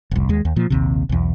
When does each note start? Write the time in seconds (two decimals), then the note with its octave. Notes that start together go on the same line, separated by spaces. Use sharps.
0.11 F1 C2
0.29 D#2 G#3
0.45 D#2
0.56 A#2 F3
0.70 A#1 D#2 C3
1.09 B1 E2